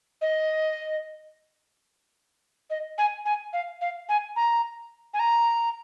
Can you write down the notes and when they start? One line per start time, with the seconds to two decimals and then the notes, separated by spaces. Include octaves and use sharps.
0.21 D#5
2.70 D#5
2.98 G#5
3.25 G#5
3.53 F5
3.81 F5
4.09 G#5
4.36 A#5
5.14 G#5
5.19 A#5